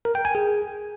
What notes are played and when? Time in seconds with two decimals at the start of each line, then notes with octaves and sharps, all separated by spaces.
0.05 A#4
0.15 G5
0.25 G#5
0.35 G#4